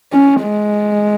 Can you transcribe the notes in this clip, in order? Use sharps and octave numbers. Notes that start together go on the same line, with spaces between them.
C#4
G#3